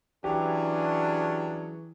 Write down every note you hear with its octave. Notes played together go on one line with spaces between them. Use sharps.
E3 F#3 C#4 D4 G4 G#4